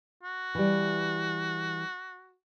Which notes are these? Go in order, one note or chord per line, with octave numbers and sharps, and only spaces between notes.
F#4
E3 G3